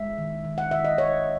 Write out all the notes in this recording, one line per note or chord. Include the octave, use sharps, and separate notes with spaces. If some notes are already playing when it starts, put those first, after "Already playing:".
Already playing: G#3 E5
D#3
D#3
F#5
D#3 E5
D#5
D#3 C#5